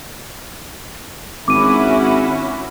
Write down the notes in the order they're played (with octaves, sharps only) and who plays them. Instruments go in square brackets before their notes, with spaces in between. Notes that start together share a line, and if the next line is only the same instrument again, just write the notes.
[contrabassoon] G#1 [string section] C#4 E4 F#4 [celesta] D6 D#7